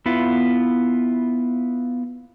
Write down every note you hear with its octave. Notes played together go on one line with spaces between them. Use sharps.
B3 E4 F4